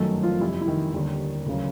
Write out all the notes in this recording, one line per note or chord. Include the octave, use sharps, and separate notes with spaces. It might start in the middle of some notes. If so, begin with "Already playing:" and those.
Already playing: G1 F#2 D#3 F#3 A3 A4
F3 F4
F2 C3 E3 G3 E4
E4
D#3 D#4
D#2 D3 G3
D2 C#3 F#3